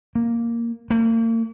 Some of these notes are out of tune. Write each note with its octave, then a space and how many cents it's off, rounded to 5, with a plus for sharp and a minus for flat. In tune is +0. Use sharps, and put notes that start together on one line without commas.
A#3 +0
A#3 -40